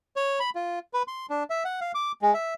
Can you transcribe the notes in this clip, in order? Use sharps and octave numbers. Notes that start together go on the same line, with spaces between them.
C#5
B5
F4
B4
C6
D4
E5
F#5
F5
D6
G#3
E5